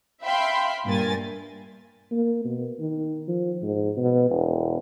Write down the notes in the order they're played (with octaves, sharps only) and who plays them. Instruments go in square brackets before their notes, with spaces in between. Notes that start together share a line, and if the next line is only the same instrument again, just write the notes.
[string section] E5 F5 G5 B5 C6
G2 A#2 A#4 G#5 A6
[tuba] A#3
B2
D#3
F3
G#2
B2
E1